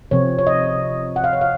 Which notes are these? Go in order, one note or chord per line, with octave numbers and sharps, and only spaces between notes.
C3 F3 C4 C#5
C#5
D#5
F#5
F5
C#5
F5